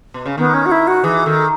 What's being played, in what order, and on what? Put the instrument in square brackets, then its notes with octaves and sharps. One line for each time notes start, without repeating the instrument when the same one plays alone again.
[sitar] B2
C#3
[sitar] D#3 [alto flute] B3
[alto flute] C#4
F#4
E4
F#4
[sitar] E3 [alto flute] G#4
[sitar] D#3 [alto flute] A4